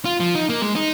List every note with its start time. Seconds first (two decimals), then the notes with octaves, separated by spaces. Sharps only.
0.05 F4
0.20 F3
0.35 D#4
0.50 A#3
0.62 G#3
0.76 D#4